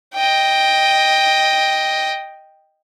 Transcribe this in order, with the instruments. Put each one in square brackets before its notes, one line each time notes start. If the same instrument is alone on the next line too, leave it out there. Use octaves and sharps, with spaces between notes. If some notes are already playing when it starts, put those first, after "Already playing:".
[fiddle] D#5 G5